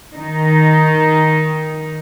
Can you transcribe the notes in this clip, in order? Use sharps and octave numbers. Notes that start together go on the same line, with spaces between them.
D#3 D#4